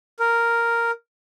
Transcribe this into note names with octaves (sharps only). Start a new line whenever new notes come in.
A#4